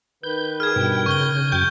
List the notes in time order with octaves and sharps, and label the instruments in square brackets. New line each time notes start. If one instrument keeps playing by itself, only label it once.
[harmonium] D#3 B4 [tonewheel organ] G6
[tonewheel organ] G#4 [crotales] F6 G#6
[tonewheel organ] G2 B2 G5
[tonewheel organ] C#3 G6 [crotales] C#6 G7
[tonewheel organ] F#2 G5 G#6 [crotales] G6